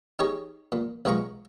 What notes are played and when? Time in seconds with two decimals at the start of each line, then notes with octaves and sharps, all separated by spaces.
0.19 D#4 G4 G#4 C#5 D#5
0.72 A#2
1.05 B1 B2 G#3 F4 A#5 C#6